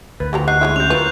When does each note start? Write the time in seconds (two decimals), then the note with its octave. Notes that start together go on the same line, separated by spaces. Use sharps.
0.20 D2 B4
0.33 D3 F3 F#4 G4 A#5
0.48 D#4 F#5 F#6 C7
0.61 G#3 E4 C#5 E5
0.76 C#4 F#4 G6 F7
0.90 E3 F#3 E4 F4 A#4 B4